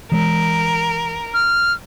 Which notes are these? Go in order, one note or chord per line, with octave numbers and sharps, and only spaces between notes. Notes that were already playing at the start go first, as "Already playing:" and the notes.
E3 G#3 A#4
F6